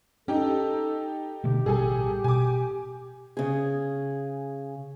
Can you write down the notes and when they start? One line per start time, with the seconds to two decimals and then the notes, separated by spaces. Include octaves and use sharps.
0.28 C#4 D#4 G4 A4
1.44 B2 D3 A3 G4
1.66 A1 B2 G3 G#4 A4 G#5
2.24 B2 G#5 D6
3.37 C#3 G#4